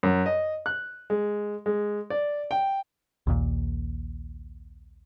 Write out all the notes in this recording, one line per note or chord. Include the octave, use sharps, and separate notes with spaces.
F#2
D#5
F#6
G#3
G#3
D5
G5
A#1 D#2 A#2